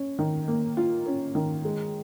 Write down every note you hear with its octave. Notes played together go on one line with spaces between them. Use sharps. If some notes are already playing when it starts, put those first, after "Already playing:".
Already playing: C#4
D#3
A#3
F4
C#4
D#3
G#3